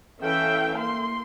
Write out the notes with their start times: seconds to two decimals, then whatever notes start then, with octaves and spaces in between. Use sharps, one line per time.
0.20 E3 C#4 A4 E5 F5 G5
0.78 A#3 C6